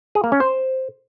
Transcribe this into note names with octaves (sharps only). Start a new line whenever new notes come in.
G#4
A#3
C#4
C5